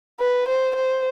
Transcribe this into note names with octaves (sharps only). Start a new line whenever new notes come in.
B4
C5
C5